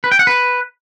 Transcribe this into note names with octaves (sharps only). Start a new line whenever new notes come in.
B4
G5
F#5
B4